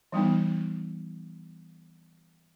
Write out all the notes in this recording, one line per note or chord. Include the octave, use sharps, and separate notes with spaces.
E3 G3 B3 D#4